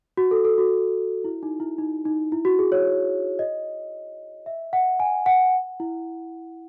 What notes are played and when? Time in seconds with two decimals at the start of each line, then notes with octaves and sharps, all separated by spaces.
0.17 F#4
0.31 A4
0.45 A4
0.58 F#4
1.24 E4
1.43 D#4
1.60 E4
1.78 D#4
2.05 D#4
2.32 E4
2.45 F#4
2.59 G#4
2.72 C#5
3.39 D#5
4.46 E5
4.73 F#5
5.00 G#5
5.26 F#5
5.80 E4